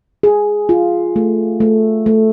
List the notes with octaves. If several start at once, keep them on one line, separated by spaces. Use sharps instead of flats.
G#4
F4
A3
A3
A3